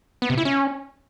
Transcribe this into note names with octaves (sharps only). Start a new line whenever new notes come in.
B3
C3
E4
C#4